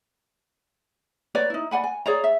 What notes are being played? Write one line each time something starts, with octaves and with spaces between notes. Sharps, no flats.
B4 C#5 D5 A#5
D#4 E4
D5 F#5 G#5 B5
G#5
G#4 C#5 D5 A#5
E5